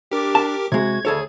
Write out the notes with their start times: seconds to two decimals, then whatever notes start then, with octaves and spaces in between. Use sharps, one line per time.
0.12 D4 G4 A#4 D6
0.35 A5
0.72 C3 G#3 F#4 G#6
1.05 D2 G#4 A4 C#5